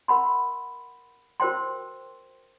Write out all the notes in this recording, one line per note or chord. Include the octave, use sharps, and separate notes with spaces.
A#4 F#5 B5 C6
F#4 A#4 C5 G5 C6